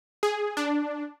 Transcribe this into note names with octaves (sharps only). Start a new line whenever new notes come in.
G#4
D4